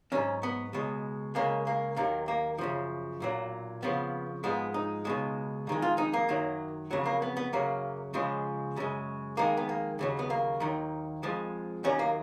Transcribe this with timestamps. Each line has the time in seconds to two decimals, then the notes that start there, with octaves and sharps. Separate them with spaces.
0.12 G#2 F#3 C#4
0.43 B3
0.73 C#2 B2 G#3
1.35 C#2 C#3 G#3 A#3
1.67 A#3
1.96 D#2 D#3 F#3 A#3
2.28 A#3
2.58 F#2 C#3 F3
3.20 B1 A#2 F#3
3.82 F2 C#3 F3 B3
4.44 G#2 F3 G#3 B3
4.74 D#4
5.05 C#2 B2 G#3
5.67 F2 D#3 G#3
5.82 F4
5.98 D#4
6.13 A#3
6.29 F#2 D#3 F#3
6.91 F2 C#3 F#3
7.06 A#3
7.22 B3
7.37 B3
7.53 F#2 C#3 F#3 A#3
8.14 C#2 C#3 F3 G#3
8.76 F#2 C#3 G#3
9.37 F2 D#3 G#3 A#3
9.57 B3
9.69 A#3
9.99 D#2 C#3 F#3
10.19 B3
10.30 A#3
10.60 D#2 D#3 F#3
11.23 F2 F3 G#3
11.84 D#2 D#3 F#3 C#4
11.99 A#3